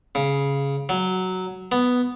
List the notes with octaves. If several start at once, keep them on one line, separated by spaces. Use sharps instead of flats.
C#3
F#3
B3